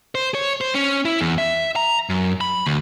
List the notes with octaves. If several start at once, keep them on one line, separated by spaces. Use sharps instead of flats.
C5
C#5
C5
C#4
E4
E2
E5
A#5
F#2
B5
D2